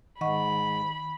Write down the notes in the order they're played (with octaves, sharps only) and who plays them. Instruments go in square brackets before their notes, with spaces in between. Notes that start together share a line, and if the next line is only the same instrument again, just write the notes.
[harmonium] G#2 [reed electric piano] D#3 [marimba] D#5 F#5 C#6 [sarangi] B5